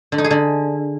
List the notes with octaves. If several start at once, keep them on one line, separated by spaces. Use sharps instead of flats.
D3
D#4
G#4
D3